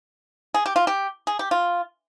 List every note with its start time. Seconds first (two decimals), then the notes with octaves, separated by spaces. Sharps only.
0.54 G#4
0.66 G4
0.76 F4
0.87 G4
1.27 G#4
1.39 G4
1.51 F4